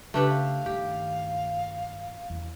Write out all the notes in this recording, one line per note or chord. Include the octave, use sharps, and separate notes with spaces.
C#3 A3 D4 G4 B4
F5
G2 D#3 G4
E2